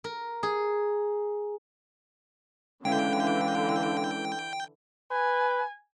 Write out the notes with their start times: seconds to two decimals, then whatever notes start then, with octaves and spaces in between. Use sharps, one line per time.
0.04 A#4
0.43 G#4
2.85 D3 E3 G#3 C#4 E4 F5 G5
5.12 B4 G#5